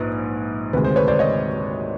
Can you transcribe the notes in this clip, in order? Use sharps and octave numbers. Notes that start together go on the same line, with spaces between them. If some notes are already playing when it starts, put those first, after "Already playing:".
Already playing: A#1 G#2 B4
D2 C3 D#3 G#3 B4
C5
B4 C#5
C5 D5
C#5 D#5